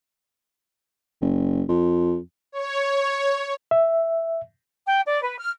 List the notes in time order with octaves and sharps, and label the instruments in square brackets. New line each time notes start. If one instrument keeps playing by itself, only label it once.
[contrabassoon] F#1
F2
[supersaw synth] C#5
[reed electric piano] E5
[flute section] G5
D5
B4
F6